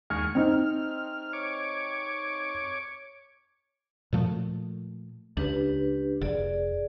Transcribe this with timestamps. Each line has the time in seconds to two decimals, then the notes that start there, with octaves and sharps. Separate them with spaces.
0.10 D#2 G#3 C#6 F6
0.35 C4 D#4 F6
1.33 C#5 D6
4.13 A#2 F3 A3
5.37 C#2 D4 G4 B4
6.21 F1 G#4 D5